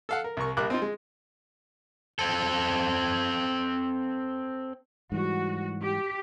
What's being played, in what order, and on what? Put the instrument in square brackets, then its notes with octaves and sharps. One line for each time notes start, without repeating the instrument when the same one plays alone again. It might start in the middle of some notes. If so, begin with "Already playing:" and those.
[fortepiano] A4 F5 F#5
A#4
C2 A#4 C#6
A#1 G3 A#4 D6 F#6
C4 D#4 F4
G#3
[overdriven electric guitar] C4 A4
[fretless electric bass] G#2 E3 G3 [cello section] F#4
[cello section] G4